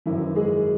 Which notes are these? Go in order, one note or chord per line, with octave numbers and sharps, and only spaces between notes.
G#1 F#2 D#3 E3 E4
G#3 G#4